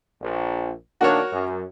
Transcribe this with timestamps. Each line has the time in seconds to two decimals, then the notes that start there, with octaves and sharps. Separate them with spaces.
0.22 A#1
1.01 D#3 A#3 D4 F#4 A#4 C#5
1.32 F#2